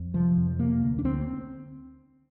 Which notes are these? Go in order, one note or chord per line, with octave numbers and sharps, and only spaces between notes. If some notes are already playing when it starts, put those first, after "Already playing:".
Already playing: F2
C3 F3
F2
C3 A#3
D2
D4
D2 C4